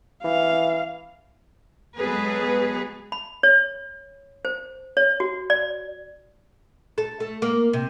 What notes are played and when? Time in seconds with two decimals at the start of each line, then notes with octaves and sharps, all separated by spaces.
0.24 E3 F5
1.97 F#3 G#3 B3 G#4 A4 B4
3.12 B5
3.43 C#5
4.45 C5
4.97 C#5
5.20 F#4
5.50 D5
6.98 A4
7.20 A3
7.42 A#3
7.73 C3